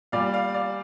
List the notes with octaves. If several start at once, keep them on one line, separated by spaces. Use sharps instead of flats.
A#2 G3 D5 F5
D5 F5
D5 F5